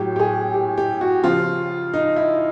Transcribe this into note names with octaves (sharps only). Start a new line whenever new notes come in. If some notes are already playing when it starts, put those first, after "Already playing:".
Already playing: A2 F#3 G4
G4
G#4
G4
G4
F#4
C#3 F3 F4
D#4
E4